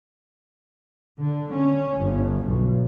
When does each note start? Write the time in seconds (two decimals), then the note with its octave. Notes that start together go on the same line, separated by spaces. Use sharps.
1.19 D3
1.52 C#4
1.97 G1
2.43 B1